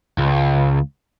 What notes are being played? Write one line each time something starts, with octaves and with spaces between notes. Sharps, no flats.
C#2